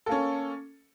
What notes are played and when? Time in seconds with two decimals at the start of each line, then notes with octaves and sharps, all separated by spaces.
0.06 A4
0.09 A#3
0.11 C#4